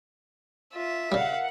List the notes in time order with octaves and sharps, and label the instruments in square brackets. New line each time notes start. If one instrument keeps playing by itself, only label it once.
[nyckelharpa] F4 [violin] E5
[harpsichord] C#3 G3 [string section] A#4 F#5 [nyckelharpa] F5